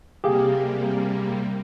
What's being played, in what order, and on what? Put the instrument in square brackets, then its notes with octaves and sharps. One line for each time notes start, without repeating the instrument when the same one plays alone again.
[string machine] C3 G3 A#3 [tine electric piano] G4 G#4 F5